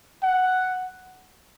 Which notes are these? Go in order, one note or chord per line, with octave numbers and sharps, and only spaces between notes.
F#5